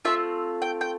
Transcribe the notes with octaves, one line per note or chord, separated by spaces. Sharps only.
A3 C4 F4 E5
G5
G5